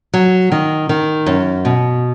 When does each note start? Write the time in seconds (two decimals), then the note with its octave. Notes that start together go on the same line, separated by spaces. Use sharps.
0.14 F#3
0.52 D#3
0.89 D#3
1.26 F#2
1.65 B2